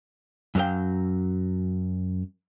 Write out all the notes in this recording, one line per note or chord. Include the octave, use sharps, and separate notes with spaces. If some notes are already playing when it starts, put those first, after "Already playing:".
F#2 F#3 D4 F5 G5